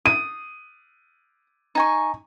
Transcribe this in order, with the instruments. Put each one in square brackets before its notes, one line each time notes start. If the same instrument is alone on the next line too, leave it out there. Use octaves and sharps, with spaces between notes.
[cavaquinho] D#6 [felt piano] D#7
[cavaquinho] D#4 G#5 C#6